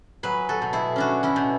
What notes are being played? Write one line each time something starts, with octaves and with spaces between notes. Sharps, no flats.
F#3 G#4 B4
F#4 A4
B2
E4 G#4
C#4 D4 F#4
C#4 E4
B2